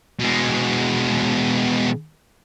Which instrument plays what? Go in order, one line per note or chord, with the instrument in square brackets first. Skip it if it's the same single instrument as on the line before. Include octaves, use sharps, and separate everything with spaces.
[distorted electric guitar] B2 G#3